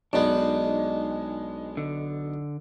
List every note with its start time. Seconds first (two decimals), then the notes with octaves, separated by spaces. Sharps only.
0.13 B1 G#3 B3 D4 D#4 D5 D#5
1.77 D3